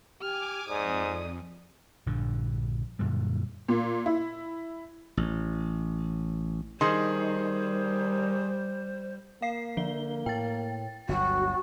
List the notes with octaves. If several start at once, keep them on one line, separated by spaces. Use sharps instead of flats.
G4 G#5 D6 F6
F2 G#2 D5 D#6
A#1 G2 D3
F#2 A#2 D3 G3
A#2
E4
A1
D#3 G3 G#4 C5 C6
A#3 F5 C7
D3 F3 G7
A2 G5 A6
G1 D2 F#3 F#4